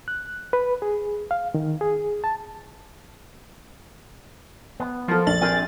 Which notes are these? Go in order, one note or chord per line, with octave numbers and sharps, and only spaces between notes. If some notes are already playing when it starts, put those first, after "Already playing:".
F#6
B4
G#4
F5
D#3
G#4
A5
B3
F3 A4 A#4
A#1 A6 F#7
C4 G4 G#4 A#4 G#5